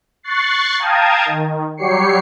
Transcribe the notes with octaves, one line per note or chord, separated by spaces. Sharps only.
C#6 F#6 A6 C7
F5 G5 A5 A#5 D#6 G#6
D#3
F#3 G3 G4 C#5 C7 C#7